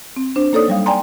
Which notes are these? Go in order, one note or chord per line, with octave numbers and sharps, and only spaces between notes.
C4
D4 C5
A#3 D#4 A4 C#5 D5 D#6
F#3 G3 F5
D5 G5 G#5 A#5 C6